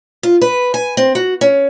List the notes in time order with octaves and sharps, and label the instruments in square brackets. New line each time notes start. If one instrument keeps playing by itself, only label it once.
[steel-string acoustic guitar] F4
B4
G#5
C4
F#4
C#4